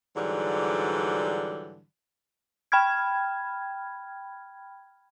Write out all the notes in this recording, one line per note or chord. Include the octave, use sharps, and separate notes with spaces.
G#2 D3 E3 F#3 G3
G5 B5 F6 G#6